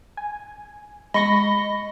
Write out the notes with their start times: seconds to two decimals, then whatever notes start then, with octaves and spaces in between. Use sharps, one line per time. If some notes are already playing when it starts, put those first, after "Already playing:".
0.17 G#5
1.14 G#3 D#5 B5 C#6 A#6